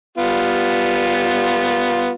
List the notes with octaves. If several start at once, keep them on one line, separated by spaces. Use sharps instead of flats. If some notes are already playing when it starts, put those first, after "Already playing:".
G3 B3 F4